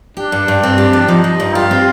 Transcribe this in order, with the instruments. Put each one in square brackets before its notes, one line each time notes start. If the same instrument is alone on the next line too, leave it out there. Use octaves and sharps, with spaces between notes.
[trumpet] D4 [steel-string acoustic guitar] G4
[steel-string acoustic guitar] G2
G2
C4
G4
F3
[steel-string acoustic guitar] F3 [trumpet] D#4
[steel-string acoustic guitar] F3
G2
[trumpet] F4 [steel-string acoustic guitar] G4
[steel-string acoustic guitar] C4